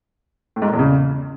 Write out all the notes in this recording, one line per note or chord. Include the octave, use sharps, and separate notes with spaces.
A2
G#2
A#2
E2
C#3